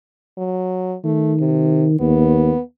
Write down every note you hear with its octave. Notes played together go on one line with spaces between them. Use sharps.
F#3
D#3 A3
C3
D#2 B3